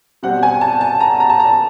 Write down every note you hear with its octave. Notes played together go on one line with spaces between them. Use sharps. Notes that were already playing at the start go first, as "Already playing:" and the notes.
B2 G3 C4 F#5
G#5
A5
A5
A#5
A#5
A5
A#5